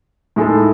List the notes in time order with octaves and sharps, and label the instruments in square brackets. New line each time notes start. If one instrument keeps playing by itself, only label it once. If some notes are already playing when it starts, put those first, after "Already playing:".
[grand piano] A2 G#3 D#4 A4